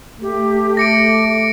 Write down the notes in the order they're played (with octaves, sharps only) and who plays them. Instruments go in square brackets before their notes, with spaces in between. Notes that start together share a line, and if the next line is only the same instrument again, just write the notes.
[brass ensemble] A3 [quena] G4
[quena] D6 [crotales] A#6 C#7 D7